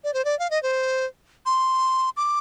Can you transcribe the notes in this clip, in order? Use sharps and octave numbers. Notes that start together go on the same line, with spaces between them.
D5
C5
D5
F5
D#5
C5
C6
D6